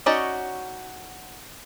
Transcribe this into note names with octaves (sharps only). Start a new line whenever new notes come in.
C#4 D#4 F#4 D5 D#5